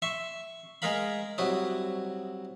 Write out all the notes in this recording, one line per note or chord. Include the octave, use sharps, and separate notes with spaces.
E5 C6 C#6
G#3 G#4 A#4 F5 B5
C2 F#3 E4 D#6